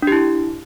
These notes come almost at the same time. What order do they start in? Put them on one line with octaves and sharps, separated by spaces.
D4 G4 E4